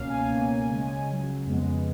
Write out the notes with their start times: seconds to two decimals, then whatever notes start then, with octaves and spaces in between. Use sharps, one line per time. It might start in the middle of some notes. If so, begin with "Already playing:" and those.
Already playing: C#2 B2 A#3 C#4 F5
0.10 G#5
0.30 C#2 B2 A#3 C#4
0.69 C#2 C#3 G#3 C#4
1.07 C#2 C#3 F#3
1.46 F2 C#3 G#3 B3